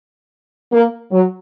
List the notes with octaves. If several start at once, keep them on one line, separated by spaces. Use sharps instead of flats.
A#3
F#3